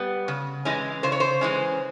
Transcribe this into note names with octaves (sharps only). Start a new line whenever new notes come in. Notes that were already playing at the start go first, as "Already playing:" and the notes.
Already playing: G3 B3
C#3
E3 G#3 C#4
C#3 C5
C#5
C5
E3 G#3 C#4